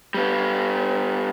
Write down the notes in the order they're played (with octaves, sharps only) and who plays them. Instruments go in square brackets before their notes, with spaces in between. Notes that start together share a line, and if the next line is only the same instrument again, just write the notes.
[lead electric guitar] G3 B3